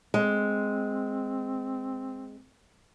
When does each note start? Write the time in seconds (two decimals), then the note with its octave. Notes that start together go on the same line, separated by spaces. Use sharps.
0.14 G#3 C4